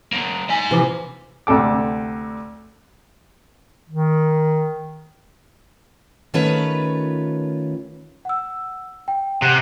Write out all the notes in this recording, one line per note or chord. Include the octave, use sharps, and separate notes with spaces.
A#3 C#4
D#4 G#5
C3 E3 F3
D2 C3 A4 D6
D#3
D#3 A3 C#4 F4 B4
F#5 E6
G5
C3 F#5 F#6